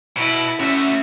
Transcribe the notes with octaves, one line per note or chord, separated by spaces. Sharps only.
B2 E4
A3 C#4 F#4 E5